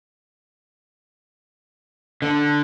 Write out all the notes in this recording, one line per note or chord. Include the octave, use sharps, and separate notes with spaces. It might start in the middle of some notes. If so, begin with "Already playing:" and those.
D3